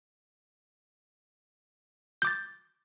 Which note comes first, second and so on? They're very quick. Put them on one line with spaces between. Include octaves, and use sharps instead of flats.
G6 D6 A6